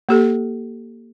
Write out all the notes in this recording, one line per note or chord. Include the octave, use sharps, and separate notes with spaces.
A#3 G4 A4